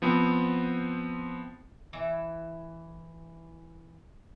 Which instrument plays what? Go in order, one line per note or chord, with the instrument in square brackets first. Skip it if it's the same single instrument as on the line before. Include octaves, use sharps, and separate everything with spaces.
[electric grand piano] F3 B3 C4
[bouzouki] E3 E5